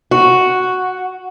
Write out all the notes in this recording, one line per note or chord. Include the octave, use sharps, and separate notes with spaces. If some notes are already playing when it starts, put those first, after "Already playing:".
F#4